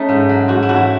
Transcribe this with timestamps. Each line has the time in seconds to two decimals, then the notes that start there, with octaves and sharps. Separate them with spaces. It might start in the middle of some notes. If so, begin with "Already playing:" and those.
Already playing: A3 C#4 D#4
0.09 G#2
0.29 F#3
0.48 G#2 F#4
0.63 E4
0.68 A3 F#4
0.76 E4